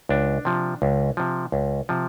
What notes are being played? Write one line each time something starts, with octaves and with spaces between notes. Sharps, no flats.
C#2 D4
C3 F3
C#2
C3 F3
C#2
C3 F3